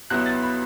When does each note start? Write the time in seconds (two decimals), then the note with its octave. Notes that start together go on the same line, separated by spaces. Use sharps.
0.10 C#2 B2 F#3 B3 E4 F#6
0.26 A6
0.42 B5